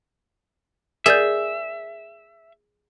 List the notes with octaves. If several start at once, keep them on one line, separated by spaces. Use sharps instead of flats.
G#4 A#4 D5 E5 G6